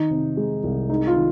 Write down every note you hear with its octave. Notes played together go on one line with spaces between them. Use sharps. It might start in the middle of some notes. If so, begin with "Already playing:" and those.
Already playing: D#3 D#4
C3
G#3
C2
G#3 D#4
F4
D#3